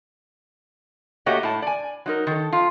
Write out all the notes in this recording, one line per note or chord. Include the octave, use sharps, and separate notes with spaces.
A3 A#3 F#4 G4 C#5 D#5
A2 A5
D5 G#5
F#3 D#4 A#4
D#3 A4
F2 F4